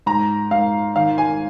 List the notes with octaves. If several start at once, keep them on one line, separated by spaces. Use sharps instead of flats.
G#2 A#5
G#2 F5
D#3 F5
G#5